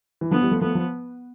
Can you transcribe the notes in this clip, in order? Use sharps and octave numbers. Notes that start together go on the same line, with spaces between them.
E3
D3 F3 B3
E3 G3
F3 A3
F3 A3 B3
F3